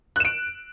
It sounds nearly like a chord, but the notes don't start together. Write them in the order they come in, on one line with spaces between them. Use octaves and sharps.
F#6 E7 D7